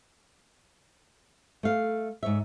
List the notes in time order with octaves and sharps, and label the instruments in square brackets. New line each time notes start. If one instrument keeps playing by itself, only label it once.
[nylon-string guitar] A3 F5
G#2 C#5 E5